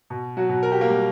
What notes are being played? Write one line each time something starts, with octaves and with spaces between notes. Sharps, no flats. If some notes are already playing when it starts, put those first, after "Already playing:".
B2
F#3 F#4
B2
A#4
G4
A#3 A#4
G3